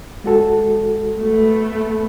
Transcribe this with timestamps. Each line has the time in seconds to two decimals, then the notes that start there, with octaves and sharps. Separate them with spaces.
0.24 G#3 F#4 A4
1.18 A3 B3